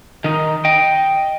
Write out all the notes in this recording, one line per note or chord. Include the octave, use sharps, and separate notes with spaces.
D#3 D#4
D#5 G5